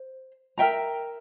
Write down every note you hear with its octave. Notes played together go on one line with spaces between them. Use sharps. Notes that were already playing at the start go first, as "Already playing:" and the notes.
Already playing: C5
A#4 E5 G5 A#5